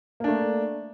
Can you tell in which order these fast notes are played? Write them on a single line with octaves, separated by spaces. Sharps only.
A#3 D4 A3